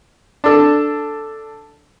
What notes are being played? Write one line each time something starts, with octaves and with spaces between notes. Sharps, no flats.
D4 A4